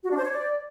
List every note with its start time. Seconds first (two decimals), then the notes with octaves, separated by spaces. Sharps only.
0.04 F#4
0.11 D4
0.18 C5
0.24 C#5
0.31 D5